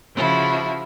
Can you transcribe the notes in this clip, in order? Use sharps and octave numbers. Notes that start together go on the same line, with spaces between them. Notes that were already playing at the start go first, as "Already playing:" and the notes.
C#3 F3 E4 F#4